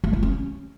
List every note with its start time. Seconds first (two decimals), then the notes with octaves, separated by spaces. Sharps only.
0.04 A3
0.13 E4
0.23 C#4